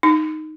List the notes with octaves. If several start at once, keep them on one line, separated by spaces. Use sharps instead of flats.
D#4